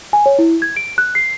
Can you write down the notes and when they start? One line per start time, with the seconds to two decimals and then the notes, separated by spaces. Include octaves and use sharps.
0.13 G#5
0.26 C#5
0.39 E4
0.62 G#6
0.77 D7
0.98 F#6
1.15 C7